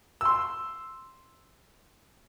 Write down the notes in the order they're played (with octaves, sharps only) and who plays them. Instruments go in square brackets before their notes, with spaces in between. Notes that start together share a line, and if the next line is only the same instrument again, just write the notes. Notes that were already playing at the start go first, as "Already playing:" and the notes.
[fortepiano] C6 E6